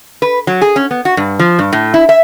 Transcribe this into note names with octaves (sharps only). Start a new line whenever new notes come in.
B4
F#3
G#4
C#4
B3
F#4
G2
F3
G2
A2
E4
E5